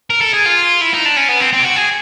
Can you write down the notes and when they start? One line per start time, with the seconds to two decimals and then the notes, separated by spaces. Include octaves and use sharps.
0.10 A#4
0.21 A4
0.34 G#4
0.46 F4
0.81 E4
0.94 D#4
1.05 D4
1.16 C#4
1.29 B3
1.40 C4
1.53 C4
1.59 G4
1.64 F#4
1.76 G#4